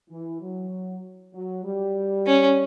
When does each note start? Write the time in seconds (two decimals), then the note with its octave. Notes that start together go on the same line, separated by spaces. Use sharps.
0.10 E3
0.41 F#3
1.34 F#3
1.65 G3
2.26 C#4